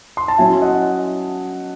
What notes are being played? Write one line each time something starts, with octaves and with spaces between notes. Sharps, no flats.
C6
A5
F#3 C#4 E4 E5 G#5
D#5 F#5